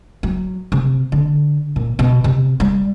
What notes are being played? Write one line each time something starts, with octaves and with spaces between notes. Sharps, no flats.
F#3
C3
D3
A#2
B2
C3
G3